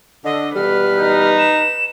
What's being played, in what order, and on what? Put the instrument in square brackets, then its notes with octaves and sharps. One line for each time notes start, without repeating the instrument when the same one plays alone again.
[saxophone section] D3 [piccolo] D#5
[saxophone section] B2 E3 G3 [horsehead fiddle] B4 [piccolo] F6
[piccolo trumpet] D#4
[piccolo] E7